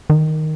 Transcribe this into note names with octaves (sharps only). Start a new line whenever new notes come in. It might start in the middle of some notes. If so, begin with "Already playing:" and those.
D#3